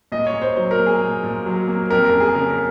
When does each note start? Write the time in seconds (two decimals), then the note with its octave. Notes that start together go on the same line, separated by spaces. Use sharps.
0.12 A#2 D#5
0.26 C#5
0.34 A#2
0.42 C5
0.56 F#3 C5
0.71 A#4
0.79 A#3
0.86 G#4
1.02 A#2
1.23 A#2
1.46 F#3
1.68 A#3
1.90 F2 A#4
2.05 A#4
2.13 C#4
2.20 G#4
2.34 C#3 A#4
2.50 A#4